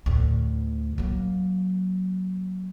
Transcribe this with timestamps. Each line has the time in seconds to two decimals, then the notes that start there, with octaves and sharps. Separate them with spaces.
0.06 D2 A2
0.98 F#3 A#3